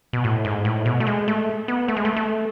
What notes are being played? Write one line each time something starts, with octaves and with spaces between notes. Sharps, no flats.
B2
A2
G#2
A2
B2
A3
G#3
A3
B3
A3
G#3
A3
A3